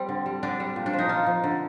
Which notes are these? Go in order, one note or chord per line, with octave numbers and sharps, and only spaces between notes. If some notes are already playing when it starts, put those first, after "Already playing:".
Already playing: G3 C4
D3
G3
D3 D4
G3
A#2
D4
F3
D#4
A#2 F4
F3
D3